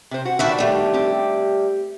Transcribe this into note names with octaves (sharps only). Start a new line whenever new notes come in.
C3 C5
F#4
D#3 D4 F#4 B4 E5 G5
G3 A3
C4 G4